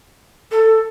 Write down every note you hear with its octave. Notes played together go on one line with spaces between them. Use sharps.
A4